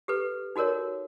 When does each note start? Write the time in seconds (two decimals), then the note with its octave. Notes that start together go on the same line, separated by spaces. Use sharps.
0.08 G4 A4 B4
0.56 D#4 F#4 A4 A#4 C#5